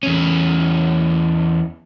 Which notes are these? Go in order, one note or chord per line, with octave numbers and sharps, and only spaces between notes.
E2 C#4